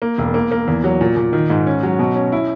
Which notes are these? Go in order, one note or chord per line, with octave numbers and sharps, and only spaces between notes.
A#3
E1
A#3
A#3
E2
F#3
A#2
A#2
D#3
G#2
C#4
F#3
B2
C#4
E4